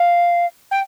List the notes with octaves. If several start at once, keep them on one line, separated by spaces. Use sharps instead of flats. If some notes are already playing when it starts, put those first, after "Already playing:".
Already playing: F5
G5